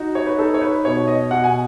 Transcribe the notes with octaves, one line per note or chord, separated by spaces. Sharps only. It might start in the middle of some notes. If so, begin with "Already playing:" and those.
Already playing: D#4 F#4
C#5
B4
D#4 A4
C#5
B4
B2 C#5
D#5
B2 F#5
G#5